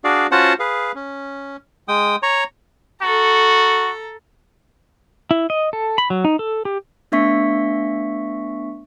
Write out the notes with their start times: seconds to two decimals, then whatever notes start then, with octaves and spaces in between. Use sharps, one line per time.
0.04 D4 F#4 G#4 D5 F5
0.32 C#4 F4 F#4 C5 F#5 A5
0.59 G#4 B4 F5
0.95 C#4
1.88 G#3 G5 D#6
2.23 C#5 A#5 C#6
3.02 F#4 A4 A#5
5.31 E4
5.50 D#5
5.73 A4
5.98 B5
6.10 F#3
6.25 D#4
6.39 A4
6.65 G4
7.12 A3 B3 D4 E5 C#6 B6